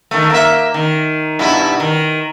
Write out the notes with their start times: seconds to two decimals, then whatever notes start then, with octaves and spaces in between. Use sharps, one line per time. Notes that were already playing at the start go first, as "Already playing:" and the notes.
0.11 D#3 A3
0.30 A#3 E5
0.74 D#3
1.39 G2 B2 E4
1.80 D#3